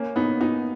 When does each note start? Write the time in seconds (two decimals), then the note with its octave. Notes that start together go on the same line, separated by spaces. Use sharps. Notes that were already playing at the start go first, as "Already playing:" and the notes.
Already playing: A#3 C#4
0.16 B3 D#4
0.40 B3 D#4